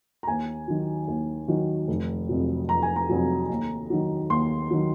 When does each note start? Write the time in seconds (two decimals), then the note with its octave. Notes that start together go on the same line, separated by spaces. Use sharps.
0.23 A#5
0.27 D#2 G#5
0.68 D#3 F#3
1.08 D#2
1.48 D#3 F#3
1.88 F1
2.29 F2 C3 F#3
2.69 F1 A#5
2.82 G#5
2.96 A#5
3.09 F2 C3 F#3
3.50 D#2
3.90 D#3 F#3
4.30 D#2 C6
4.71 D#3 F#3